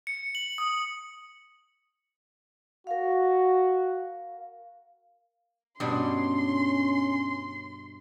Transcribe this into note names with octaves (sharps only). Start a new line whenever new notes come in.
C#7
F#7
D#6
F#4 A#4 F5
G2 B2 C#4 D4 C6